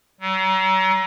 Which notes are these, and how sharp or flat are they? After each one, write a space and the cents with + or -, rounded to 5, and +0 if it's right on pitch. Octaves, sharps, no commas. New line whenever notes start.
F#3 +40